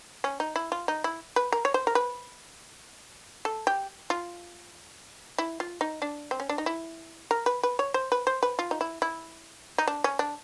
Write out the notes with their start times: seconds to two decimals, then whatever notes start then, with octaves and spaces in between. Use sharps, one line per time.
0.24 C#4
0.40 D#4
0.56 E4
0.72 F4
0.88 D#4
1.04 E4
1.36 B4
1.52 A#4
1.65 C#5
1.74 C5
1.87 A#4
1.95 B4
3.45 A4
3.67 G4
4.10 F4
5.38 E4
5.60 F4
5.81 D#4
6.02 D4
6.31 C4
6.40 C#4
6.49 D4
6.58 D#4
6.66 E4
7.31 A#4
7.46 B4
7.63 B4
7.79 C#5
7.94 C5
8.12 B4
8.27 C5
8.43 B4
8.59 F4
8.71 D#4
8.81 E4
9.02 E4
9.78 D#4
9.87 D4
10.04 C#4
10.19 D4